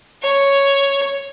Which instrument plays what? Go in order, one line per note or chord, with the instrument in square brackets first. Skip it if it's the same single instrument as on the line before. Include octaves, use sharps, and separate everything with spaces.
[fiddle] C#5